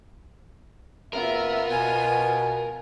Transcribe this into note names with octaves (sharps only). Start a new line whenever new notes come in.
F#1 B3 F4 A#4 E5
B2 G#5